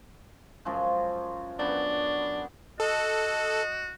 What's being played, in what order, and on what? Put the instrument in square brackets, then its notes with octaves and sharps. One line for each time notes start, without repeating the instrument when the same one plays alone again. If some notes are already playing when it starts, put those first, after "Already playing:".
[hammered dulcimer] F#2 F3 G#3
[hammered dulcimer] F#2 B3 B5 [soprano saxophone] D4
[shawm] F#4 [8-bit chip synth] A4 [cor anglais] D#5